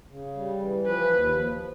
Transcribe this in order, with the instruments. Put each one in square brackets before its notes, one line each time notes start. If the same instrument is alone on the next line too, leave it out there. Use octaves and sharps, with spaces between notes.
[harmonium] C#3
G3
E3
[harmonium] F3 [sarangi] B4
[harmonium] D#2
F3